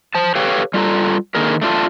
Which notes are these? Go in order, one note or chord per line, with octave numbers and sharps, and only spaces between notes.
C5 A5
G4 A4 B4 C#5 F5 G5
G3 F4 A4 A#5
D3 D#3 A#3 G#4 A#4
A3 D4 F4 A4